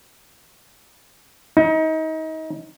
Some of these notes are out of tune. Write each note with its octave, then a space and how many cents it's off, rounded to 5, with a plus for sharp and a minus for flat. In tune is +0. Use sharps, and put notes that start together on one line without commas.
D#4 +30